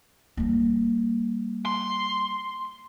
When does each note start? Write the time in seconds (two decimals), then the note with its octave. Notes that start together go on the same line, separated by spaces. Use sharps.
0.37 G3 A#3
1.65 C6